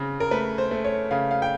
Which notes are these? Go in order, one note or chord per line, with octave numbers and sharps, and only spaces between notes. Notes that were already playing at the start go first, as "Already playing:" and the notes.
Already playing: C#3 C4
A#4
A3 B4
C5
A3
C#5
C#3 F5
F5
G5